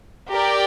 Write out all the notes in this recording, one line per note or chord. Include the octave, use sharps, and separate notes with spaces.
G4 A#4 D5 G5